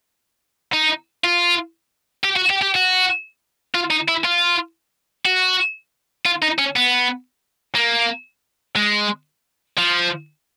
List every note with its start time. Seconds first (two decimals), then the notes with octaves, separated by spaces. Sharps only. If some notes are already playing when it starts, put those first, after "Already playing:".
0.73 D#4
1.24 F4
2.24 G4
2.36 F#4
2.50 G4
2.62 G4
2.75 F#4
3.75 F4
3.91 D#4
4.08 E4
4.25 F4
5.25 F#4
6.25 F4
6.42 D#4
6.58 C#4
6.76 B3
7.76 A#3
8.76 G#3
9.77 F3